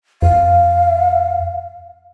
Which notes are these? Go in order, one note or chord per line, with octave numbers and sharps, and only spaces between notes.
F2 F5